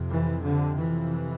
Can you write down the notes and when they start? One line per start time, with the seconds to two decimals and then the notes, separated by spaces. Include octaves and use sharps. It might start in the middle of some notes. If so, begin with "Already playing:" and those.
Already playing: F2 C3
0.12 E3
0.44 D3
0.78 E3